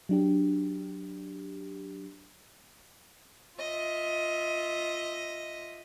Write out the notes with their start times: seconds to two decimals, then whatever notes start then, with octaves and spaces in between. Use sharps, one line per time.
0.09 F#3 D4 G4
3.60 F4 D#5 E5